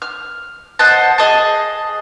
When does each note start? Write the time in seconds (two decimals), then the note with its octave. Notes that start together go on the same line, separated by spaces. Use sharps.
0.02 F6
0.79 C5 D#5 F#5 A5
1.18 G#4 D#5 A5